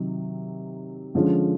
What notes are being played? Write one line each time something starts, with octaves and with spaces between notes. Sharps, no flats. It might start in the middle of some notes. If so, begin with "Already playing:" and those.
Already playing: C3 D#3 F#3
D3 F3 G#3 C#4